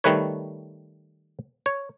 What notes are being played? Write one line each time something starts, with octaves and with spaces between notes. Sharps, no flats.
D#3 G3 A3 B4 C#5
C#5